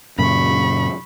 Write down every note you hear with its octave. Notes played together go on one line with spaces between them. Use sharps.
F#2 A#2 C#3 B5 C#6